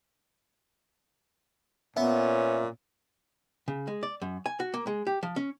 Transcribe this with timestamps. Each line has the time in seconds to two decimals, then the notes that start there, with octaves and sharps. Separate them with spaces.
1.97 A#2 B3 C#4 E5
3.68 C#3
3.88 G#3
4.03 D5
4.22 F#2
4.46 G#5
4.60 F#4
4.74 A#3
4.87 G#3
5.07 G4
5.23 F3
5.36 C#4